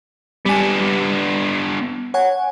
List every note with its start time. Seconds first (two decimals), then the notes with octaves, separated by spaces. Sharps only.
0.45 G3 B3 D4 G#5
0.81 G3
2.14 C#5 F#5 G#5